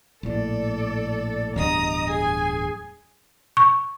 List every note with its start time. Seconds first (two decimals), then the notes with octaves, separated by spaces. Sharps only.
0.23 A#1 A2 A4 D5
1.56 D1 E2 G2 D#5 A#5 D#6
2.07 G#4 G#5
3.57 C#6